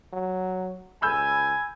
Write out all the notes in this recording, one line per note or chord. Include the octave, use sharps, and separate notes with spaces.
F#3
C#2 G#5 B5 E6 G6